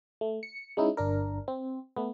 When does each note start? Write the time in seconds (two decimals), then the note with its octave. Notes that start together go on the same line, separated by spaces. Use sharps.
0.21 A3
0.43 C#7
0.77 G#3 C#4 D#4 E4
0.97 G1 D4 A#4
1.48 C4
1.97 A3 B3